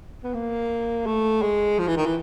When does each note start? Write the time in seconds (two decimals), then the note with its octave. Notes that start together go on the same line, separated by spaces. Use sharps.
0.23 B3
0.34 A#3
1.06 A3
1.42 G#3
1.79 F3
1.88 E3
1.97 D#3
2.06 E3